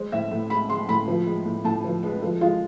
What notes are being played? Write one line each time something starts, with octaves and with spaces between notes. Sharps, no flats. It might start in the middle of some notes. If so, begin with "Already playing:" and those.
Already playing: G#3 C5
A2 E5
A2
G#3 B5
G#3 C6
A2 B5
F3
G#3
A2
A2 A5
F3
G#3 B4
F3 A4
G#3 F4